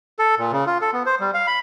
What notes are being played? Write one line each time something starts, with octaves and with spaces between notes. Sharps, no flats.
A4
A#2
C#3
F4
A4
B3
C5
G3
F5
B5